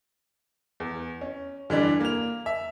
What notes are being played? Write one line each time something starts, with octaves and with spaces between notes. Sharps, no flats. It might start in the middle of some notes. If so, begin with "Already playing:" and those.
E2
C#4
D3 E3 G3 D4
A#3 F7
E5